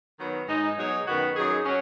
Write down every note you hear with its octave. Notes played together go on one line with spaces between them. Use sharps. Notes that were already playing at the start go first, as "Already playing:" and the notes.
D#3 F#3 B3
G#2 G#3 D#4
B2 F#3 D#4 G#4 C#5
F#2 D#3 B3 F#4
F#2 F#3 D#4 G#4
F#3 C#4